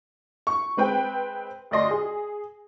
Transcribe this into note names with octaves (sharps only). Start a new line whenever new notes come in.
C#6
G#3 C4 B4 G5
D2 D5 D#5 C6
G#4